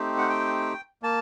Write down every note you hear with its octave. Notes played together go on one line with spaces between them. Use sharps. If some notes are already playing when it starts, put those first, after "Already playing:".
Already playing: A3 C4 D#4 G4
F#5
G5
A#3 A5